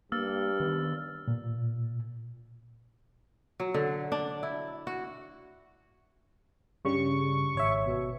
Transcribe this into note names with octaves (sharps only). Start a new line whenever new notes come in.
G2 A#3 E6 F6 A6
D#3 B3 D4
A#2
F#3
D3
D4
E4
F#4
G2 C#3 G3 C#6
G#1 C#5 E5
B2